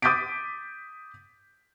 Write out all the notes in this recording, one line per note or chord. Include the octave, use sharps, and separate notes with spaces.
D6 D#6 G6 A6 B6 D7